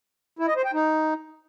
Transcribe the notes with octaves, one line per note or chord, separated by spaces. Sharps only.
E4
D#5
C5
G5
D#4